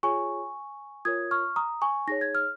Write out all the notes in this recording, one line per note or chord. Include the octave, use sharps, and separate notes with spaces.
F4 G#4 C#5 G#5 C#6
F4 A#4 C#5 D#6 G#6
C#6 F6
A#5 D#6
G#5 C#6
D#4 G#4 C#5 A#6
G#6
F6